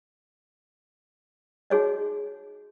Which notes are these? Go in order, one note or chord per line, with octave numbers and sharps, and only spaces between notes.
D#4 F#4 G#4 C#5 D#5